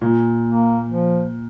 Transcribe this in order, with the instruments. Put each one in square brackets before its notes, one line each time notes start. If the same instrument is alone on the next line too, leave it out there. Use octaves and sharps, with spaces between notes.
[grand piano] A#2
[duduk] A#3
F3